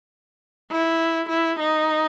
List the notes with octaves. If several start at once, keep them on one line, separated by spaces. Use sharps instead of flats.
E4
E4
D#4